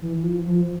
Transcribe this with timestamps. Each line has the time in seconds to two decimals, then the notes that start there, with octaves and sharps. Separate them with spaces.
0.02 E3
0.17 E3
0.23 F3
0.46 F3